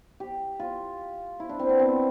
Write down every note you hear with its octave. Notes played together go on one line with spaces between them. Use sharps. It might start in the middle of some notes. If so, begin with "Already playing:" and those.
G4
F4
E4
D4
C4
B3
C4